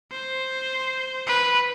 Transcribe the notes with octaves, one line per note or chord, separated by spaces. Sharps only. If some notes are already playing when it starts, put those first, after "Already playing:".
C5
B4